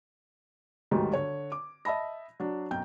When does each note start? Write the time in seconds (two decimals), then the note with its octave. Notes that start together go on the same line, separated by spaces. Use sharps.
0.91 G1 D2 G#2 D#3 F#3 G3
1.13 D3 C#5
1.52 D6
1.85 D#5 E5 A5 B5 A#6
2.40 F#3 D4
2.71 B1 F#2 G5 G6